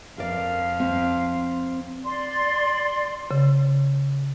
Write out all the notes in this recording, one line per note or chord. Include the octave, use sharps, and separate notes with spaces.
F2 A#4 D5 F5
C4
D5 C6
C#3